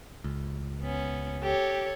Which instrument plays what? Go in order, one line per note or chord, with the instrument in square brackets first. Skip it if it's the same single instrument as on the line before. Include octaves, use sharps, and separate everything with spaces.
[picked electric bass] C#2
[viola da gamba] B3 C#4
[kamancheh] G4 [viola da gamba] A4 C#5